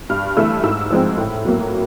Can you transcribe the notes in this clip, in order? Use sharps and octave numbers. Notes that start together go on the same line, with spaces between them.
G2 F6
E3 A3 E6
G#2 E6
F3 G#3 C4
A2
F#3 A#3